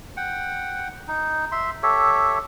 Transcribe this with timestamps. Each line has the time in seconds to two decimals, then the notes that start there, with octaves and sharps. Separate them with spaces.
0.17 F#5 G5
1.08 D#4
1.52 E5 C6
1.83 G4 A4 C#5 E5